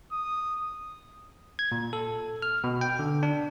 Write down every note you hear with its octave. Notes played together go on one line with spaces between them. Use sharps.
D#6
G#6
A#2
A4
F6
B2
G5
D3
D4